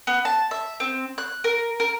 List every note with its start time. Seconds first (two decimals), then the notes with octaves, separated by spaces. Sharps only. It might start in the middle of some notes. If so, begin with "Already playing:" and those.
0.07 B3
0.25 A5
0.51 E5
0.80 C4
1.18 F#6
1.44 A#4
1.80 A#4